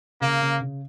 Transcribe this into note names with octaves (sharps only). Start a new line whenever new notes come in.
C#3 A#3
C#3
C#3